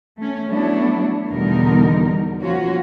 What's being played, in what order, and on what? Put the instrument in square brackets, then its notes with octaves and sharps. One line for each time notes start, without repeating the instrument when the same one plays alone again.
[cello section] A3 C#4
F#3 A3 B3 D4 E4
E2 B2 D3 G3 D#4 A#4
F3 A#3 C#4 F4 F#4